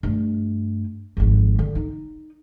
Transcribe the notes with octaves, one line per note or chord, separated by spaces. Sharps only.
G2 A3
G#1 F2
D3
D#4